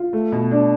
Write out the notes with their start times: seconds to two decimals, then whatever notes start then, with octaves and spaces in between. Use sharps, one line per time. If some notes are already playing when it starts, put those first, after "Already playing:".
Already playing: F4
0.13 A3
0.32 B2
0.51 D4